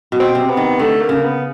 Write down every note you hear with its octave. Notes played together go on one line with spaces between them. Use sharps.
B2
C4
C3
B3
D#3
D3 A3
A#3
C#3
B3